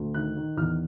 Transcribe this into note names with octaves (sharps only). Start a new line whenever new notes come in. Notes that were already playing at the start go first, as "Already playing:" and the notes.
Already playing: D2
D#3 F#6
D#3
E2 F6